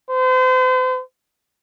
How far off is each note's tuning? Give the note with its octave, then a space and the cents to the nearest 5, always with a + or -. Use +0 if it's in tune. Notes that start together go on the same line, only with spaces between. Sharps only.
C5 -40